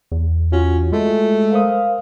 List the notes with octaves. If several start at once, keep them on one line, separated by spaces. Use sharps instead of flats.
E2
C#4 F4 F#4
G#3 A3
A#4 C5 F5 D#6